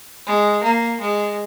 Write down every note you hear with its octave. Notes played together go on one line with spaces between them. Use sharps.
G#3
A#3
G#3